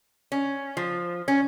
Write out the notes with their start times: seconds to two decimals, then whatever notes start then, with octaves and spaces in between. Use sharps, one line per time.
0.32 C#4
0.77 F3
1.28 C#4